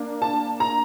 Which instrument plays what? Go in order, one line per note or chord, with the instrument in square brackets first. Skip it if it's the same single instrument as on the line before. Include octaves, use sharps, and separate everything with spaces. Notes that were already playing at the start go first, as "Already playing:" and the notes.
Already playing: [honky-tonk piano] A#3 D4
A5
A#5